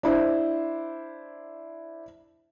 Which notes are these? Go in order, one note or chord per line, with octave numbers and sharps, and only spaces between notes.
D4 E4 C5